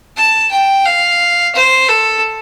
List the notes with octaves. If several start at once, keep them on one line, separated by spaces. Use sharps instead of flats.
A5
G5
F5
C5
A4